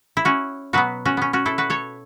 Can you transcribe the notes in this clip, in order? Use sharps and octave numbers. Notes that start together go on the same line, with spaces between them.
E4
C#4 F#4
B2 F#3 B3 F#4 B4
C#4 F#4
B3 C#4
C#4 F#4
E4 A4
F#4 B4
A4 C#5